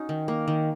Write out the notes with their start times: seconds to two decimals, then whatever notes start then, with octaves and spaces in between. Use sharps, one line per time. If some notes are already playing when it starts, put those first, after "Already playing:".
Already playing: C#4 D#4 F#4
0.09 D#3
0.28 A#3
0.48 D#3